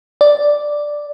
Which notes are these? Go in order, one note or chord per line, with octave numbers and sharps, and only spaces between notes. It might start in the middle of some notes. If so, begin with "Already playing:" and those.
D5